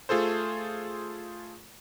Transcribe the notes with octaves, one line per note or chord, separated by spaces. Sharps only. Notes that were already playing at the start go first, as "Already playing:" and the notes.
A3 F4 G#4 A4 C5